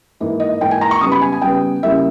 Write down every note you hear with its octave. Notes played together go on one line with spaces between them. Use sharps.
G#2 E3 A#3 D#4
D#5
G#2 E3 A#3 D#4 G5
G#5
A#5
C#6
C#3 G3 B3 D#6
B5
G#5
G#5
C#3 G3 B3 G5
C#3 G3 A#3 E4 E5